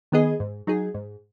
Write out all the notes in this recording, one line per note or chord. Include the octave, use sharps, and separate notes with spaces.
D#3 B3 G#4 D#5
G#2
F#3 D#4 G#4
G#2